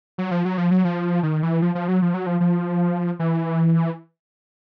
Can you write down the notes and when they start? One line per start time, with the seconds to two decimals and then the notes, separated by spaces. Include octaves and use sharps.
0.18 F#3
0.31 F3
0.45 F#3
0.58 F3
0.71 F#3
0.85 F3
1.23 D#3
1.43 E3
1.62 F3
1.75 F3
1.88 F#3
2.02 F3
2.14 F#3
2.26 F3
2.40 F3
3.19 E3